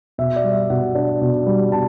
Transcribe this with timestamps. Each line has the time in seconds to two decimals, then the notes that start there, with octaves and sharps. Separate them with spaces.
0.18 B2 E5
0.36 D5
0.44 G3
0.52 E5
0.70 B2 F#5
0.95 D4
1.21 B2
1.46 G3
1.72 B2 A5